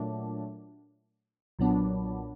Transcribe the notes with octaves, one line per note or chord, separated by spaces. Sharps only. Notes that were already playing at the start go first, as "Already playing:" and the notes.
Already playing: A#2 F#3 A3 D4
B1 A#2 F#3 B3 D4